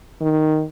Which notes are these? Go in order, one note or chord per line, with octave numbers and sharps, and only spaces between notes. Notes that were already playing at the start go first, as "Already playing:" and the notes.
D#3